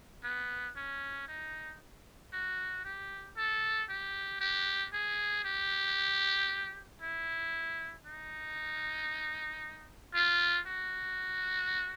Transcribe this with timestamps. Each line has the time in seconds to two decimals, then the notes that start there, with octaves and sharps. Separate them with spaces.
0.24 B3
0.76 C#4
1.28 D#4
2.33 F#4
2.85 G4
3.37 A4
3.89 G4
4.41 G4
4.93 G#4
5.45 G4
7.01 E4
8.06 D#4
10.14 F4
10.66 F#4